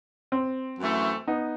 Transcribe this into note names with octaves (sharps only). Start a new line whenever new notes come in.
C4
F#2 E3 A3 E4
B3 D#4